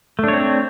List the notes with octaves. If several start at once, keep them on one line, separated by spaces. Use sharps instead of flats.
A3 C4 D4 C#5